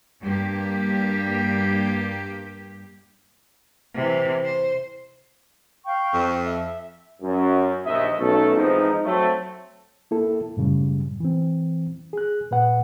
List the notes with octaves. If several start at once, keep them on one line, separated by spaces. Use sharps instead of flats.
G2 A#3 G4
C3 E3
C5
F5 G5 C#6
F2
E5
F#2
A#1 D#2 D#5 E5
B1 A3 C#4 A4
F2 G#2 E3 F3 C4 D#4
F#3 A3 C4
A#3 E4 A4
F#2 A2 C#3 G3
E3 C4
G#4 F#6
A#2 B4 F#5